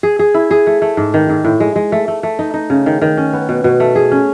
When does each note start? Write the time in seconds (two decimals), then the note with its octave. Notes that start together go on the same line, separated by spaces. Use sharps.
0.03 G#4
0.19 G#4
0.34 E4
0.51 G#4
0.67 A3
0.82 A3
0.97 G#2
1.14 D#3
1.30 G#2
1.45 A2
1.60 G#3
1.76 G#3
1.92 A3
2.08 A3
2.23 A3
2.39 D#4
2.54 D#4
2.70 C#3
2.86 D#3
3.02 D#3
3.17 C#4
3.33 B3
3.49 B2
3.64 B2
3.80 A3
3.95 G#4
4.12 C#4